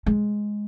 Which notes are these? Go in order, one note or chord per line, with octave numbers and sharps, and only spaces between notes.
G#3